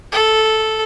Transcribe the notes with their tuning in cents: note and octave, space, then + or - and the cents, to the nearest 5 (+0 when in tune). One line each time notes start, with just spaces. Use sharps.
A4 -5